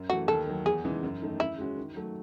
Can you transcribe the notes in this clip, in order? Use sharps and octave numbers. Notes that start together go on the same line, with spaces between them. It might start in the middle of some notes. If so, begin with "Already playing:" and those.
Already playing: F#2
E3 A3 F#4
D#2 A4
D#3 F#3
E2 G#4
C#3 E3 G#3 D#4
F#2
D#3 A3 D#4
C#3 E4
G#3 C#4 F#4
D#3
F#3 A3